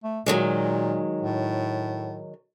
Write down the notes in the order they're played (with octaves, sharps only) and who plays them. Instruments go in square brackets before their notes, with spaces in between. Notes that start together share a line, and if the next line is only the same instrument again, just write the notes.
[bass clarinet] A3
[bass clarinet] A#2 [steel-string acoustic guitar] D#3 F#3 G#3
[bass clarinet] A2